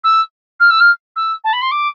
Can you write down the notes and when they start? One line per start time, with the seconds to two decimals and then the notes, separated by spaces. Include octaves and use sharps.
0.04 E6
0.60 F6
0.70 E6
0.80 F6
1.16 E6
1.44 A5
1.53 B5
1.62 C6
1.71 D6